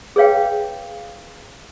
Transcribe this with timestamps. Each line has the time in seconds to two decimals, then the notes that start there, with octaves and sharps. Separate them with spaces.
0.16 G#4 B4 C#5 F5 G5